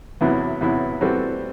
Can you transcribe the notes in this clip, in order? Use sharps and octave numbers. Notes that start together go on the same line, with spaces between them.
E2 C3 F#3 B3 E4
E2 C3 F#3 B3 E4
E3 G3 C4 F#4 A4